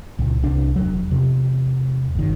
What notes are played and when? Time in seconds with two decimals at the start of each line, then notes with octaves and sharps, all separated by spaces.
0.19 C#2 A#2
0.42 C2 D4
0.76 E1 F#3
1.11 E2 C3
2.15 G1 D#3